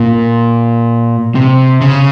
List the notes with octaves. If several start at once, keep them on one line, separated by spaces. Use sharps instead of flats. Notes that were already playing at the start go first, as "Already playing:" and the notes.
Already playing: A#2
C3
C#3